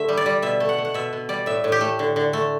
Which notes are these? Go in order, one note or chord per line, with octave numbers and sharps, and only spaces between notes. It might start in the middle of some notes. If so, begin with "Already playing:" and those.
Already playing: D3 A3 E5
G3
D5
G3
B2 E5
A3
F#5
A3
F#5
B2 E5
B2
G3 D5
A2 E5
A2
G4
A3
D3
D3
A3